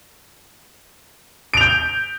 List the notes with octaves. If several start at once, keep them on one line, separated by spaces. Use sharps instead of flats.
G6 D7 F7